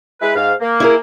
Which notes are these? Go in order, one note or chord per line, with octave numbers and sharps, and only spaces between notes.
G#3 E4 B4
G#2 F5
A#3
E4 G#4 A#4